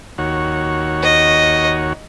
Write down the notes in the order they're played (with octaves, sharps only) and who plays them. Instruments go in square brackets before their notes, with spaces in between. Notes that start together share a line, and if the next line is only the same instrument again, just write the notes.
[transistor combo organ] D#2 F#4 C#5
[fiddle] D#5